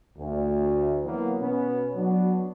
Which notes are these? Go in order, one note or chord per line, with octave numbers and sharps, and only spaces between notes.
D2
E3 F#3 A#3 B3
B2 B3 C#4
F#3 B3 D4 F#4